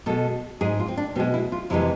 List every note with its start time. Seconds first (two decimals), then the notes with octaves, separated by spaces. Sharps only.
0.06 B2 G#3 A4
0.61 G#2 G#3 G#4
0.80 F4
0.88 C4
0.97 D4
1.16 B2 C4
1.20 G#3
1.34 E4
1.52 F4
1.70 F2 C3 E3 G#3 E4